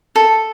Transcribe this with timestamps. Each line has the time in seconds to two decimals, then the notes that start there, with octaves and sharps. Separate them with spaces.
0.16 A4